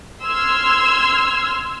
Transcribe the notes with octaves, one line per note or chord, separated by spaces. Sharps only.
C6 E6 F6 G#6